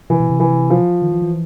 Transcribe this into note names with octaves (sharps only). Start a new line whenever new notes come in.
C3 E3
B2
C3
E3
F3
D#3
E3
E3